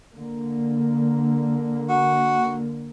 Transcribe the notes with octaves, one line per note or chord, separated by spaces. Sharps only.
D3 A#3
F#4